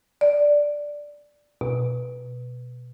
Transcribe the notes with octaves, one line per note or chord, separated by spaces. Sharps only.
D5
B2